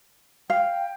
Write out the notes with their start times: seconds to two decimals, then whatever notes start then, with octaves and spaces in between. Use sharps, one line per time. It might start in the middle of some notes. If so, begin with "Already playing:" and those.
0.50 F5 G5